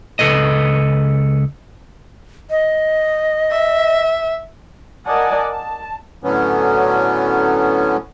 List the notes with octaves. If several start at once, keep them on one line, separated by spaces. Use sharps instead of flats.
C#2 A4 B4 D#5
D#5
E5
A#4 D5 D#5 F#5 G#5 A5
A5
A2 D3 F#3 B3 C#4